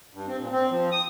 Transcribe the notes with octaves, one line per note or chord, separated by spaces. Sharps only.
G2
C4
A#2
C4
F3
D#6